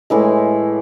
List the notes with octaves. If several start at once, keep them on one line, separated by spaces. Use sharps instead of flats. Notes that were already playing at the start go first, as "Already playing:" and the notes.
A2 E3 G#3